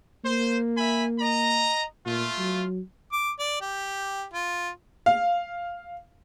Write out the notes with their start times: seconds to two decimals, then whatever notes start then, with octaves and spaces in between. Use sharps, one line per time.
0.24 A#3 C5
0.77 E5 G#5 B5
1.20 D#5 A#5
2.05 A#2 A3 F4
2.38 F#3
3.12 D6
3.39 D5
3.61 G4
4.33 F4
5.06 F5